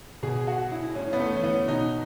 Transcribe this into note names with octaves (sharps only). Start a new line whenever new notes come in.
B2 G#4
F#4
E4
A2 C#4
B3
A3
E3 C#4
B3
B2 D#4